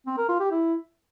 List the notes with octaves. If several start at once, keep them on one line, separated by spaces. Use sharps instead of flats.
C4
A#4
F4
G4
E4